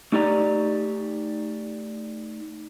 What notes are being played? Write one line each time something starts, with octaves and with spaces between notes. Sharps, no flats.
A3 D#4 G4 D5 A#5